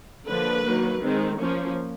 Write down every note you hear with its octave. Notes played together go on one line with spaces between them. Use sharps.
D3 F3 A#3 D4 B4
D#3 F#3 A#3
D#3 G#3 C4
F3 A#3 C#4